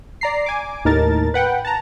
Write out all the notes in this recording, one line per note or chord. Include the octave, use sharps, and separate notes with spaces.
D5 A#5 C7
G#5 D6
D#2 A2 D#4 A#4 A5 A6
B4 F#5 G5
A5 A#5